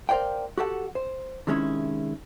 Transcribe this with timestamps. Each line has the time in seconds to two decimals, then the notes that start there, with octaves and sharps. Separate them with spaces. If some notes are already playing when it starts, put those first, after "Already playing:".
0.09 A#4 C5 D5 F5 G5
0.58 F#4 G4 A4 F#5
0.95 C5
1.47 C3 D#3 G#3 C#4 E4